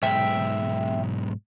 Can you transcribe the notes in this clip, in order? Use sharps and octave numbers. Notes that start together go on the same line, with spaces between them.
B1 G#2 E5 G5